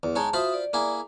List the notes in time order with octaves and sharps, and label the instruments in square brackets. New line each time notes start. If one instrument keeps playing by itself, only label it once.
[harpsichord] E2
[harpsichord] G#3 D#4 C#5 [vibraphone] A5
[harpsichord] F4 C5 B5 [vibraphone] F#4 E5 D#6
[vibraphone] D5
[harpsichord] A#3 E4 G#4